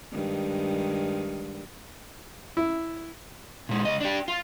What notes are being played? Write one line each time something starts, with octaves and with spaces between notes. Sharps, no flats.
G2 D#3 G#3
E4
A#2 G#3
C#2 D#5
D4 G4
F4